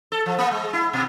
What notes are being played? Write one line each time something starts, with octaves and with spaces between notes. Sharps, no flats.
A4
F3
A#3
G#3
E4
B2